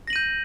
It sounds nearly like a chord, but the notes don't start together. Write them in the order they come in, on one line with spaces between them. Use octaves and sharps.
A#6 F#7 D#7 G6